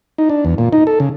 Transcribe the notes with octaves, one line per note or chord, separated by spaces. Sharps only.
D#4
D4
E2
A#2
D#4
A4
C#3